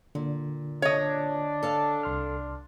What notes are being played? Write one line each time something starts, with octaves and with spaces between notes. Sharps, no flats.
A#2 D3
D4 C#5 D#5
A4 F5 A5
C2 C6 F6